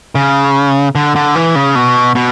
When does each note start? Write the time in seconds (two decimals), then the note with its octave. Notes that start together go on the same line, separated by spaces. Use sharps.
0.15 C#3
0.95 D3
1.16 D3
1.35 E3
1.55 C#3
1.75 B2
2.15 B2